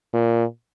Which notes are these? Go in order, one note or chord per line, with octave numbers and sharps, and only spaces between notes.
A#2